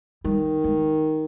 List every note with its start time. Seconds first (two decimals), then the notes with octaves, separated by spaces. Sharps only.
0.24 D#3 G3
0.64 G#3